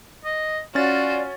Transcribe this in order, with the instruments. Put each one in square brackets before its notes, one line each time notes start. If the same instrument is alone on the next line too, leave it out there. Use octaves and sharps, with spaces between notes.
[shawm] D#5
[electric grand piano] C#4 A6 [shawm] F4 [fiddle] F#4 [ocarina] D5